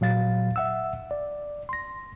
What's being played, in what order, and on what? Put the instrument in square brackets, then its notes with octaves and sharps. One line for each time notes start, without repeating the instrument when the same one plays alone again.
[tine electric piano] A#2 F#3 F5 A6
E5 F#5 E6
D5
C6 A#6